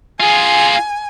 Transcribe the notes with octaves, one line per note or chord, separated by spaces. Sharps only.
F4 G#4 G#5